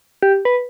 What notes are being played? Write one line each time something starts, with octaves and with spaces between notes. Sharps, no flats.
G4
B4